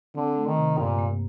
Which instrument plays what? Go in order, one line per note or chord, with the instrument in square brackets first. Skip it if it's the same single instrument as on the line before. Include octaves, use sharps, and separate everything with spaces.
[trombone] D3 [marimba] C4
[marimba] A3
[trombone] D#3
[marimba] C3
[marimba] G2 [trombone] A#2
[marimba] A#3